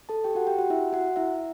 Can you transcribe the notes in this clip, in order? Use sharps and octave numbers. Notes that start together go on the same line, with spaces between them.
A4 A5
G4 G5
F#4 F#5
G4 G5
F#4 F#5
E4 E5
F#4 F#5
E4 E5